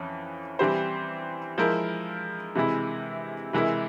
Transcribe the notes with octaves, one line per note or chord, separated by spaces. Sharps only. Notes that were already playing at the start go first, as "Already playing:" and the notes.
Already playing: F2 E3 C#4
E3 G3 C4 G4 C5
F3 G#3 E4 A#4
C3 E3 G#3 E4
C3 E3 G#3 E4 A#4